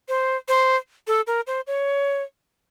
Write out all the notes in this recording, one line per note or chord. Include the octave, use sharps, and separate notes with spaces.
C5
C5
A4
A#4
C5
C#5